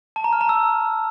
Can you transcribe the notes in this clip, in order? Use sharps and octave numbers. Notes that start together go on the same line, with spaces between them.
A5
A#5
F6
A#5
E6